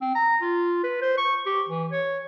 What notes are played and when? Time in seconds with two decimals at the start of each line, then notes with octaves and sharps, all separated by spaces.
0.01 C4
0.15 A#5
0.41 F4
0.84 B4
1.02 C5
1.18 C#6
1.46 G4
1.69 E3
1.91 C#5